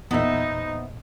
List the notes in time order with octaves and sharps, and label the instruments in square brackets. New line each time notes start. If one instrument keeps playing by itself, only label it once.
[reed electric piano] E2 A#2 [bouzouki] B3 C5 E5 [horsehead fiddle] D#4